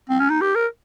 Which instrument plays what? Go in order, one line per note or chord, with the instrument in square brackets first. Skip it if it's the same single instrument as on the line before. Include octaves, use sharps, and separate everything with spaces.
[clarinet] C4
C#4
D#4
G4
A#4